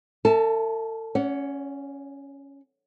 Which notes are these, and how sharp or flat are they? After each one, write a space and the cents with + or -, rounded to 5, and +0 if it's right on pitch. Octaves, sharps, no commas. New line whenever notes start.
A4 +40 E5 +0 A5 -25
C#4 +0 D5 -45 F#5 +0